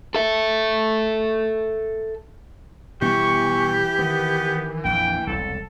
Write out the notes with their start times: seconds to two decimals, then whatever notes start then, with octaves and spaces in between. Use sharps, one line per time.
0.14 A4 E5
3.02 B2 E3 G3 B3 G4 C#6
3.99 D#3 B3
4.85 A#1 F2 G5
5.27 E1 C2 A4